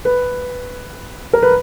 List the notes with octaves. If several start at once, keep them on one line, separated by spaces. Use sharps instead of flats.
B4
A#4
B4